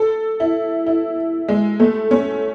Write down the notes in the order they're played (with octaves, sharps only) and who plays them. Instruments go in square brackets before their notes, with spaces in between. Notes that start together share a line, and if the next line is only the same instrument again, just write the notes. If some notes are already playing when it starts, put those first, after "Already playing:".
Already playing: [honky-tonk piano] A4
E4
E4
G#3
A3
C#4